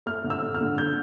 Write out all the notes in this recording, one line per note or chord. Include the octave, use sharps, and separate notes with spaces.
A3 F6
D3
E6
D3
F6
D3
D3 G6